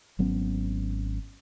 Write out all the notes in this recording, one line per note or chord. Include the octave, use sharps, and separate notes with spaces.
G#1 F#3 B3 C#4